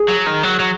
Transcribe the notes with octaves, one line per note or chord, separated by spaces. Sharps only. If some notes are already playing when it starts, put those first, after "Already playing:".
Already playing: G#4
F#3
D#3
F#3
F#3